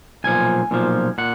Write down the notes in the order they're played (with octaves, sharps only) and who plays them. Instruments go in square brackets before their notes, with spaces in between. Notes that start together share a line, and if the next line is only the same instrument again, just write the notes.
[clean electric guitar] B1 A#2 F3 G#5
B1 A#2 F3
A#2 F#5